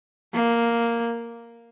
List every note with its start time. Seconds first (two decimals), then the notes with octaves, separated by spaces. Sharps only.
0.34 A#3